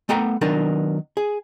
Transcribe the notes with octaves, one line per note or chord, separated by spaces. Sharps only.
A3 B3 F#5 G5 A#5
D#3 F#3 B3 D4 A#4
G#4